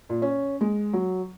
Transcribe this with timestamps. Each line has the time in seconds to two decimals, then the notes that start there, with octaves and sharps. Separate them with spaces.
0.09 A#2
0.22 C#4
0.61 G#3
0.93 F#3